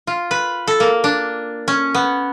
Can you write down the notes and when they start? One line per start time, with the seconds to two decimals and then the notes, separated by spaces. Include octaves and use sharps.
0.07 F4
0.31 B4
0.67 A4
0.80 A#3
1.04 D4
1.68 C#4
1.95 B3